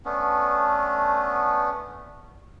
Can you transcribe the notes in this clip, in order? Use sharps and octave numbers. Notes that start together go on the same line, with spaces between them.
A3 B3 C#4 D4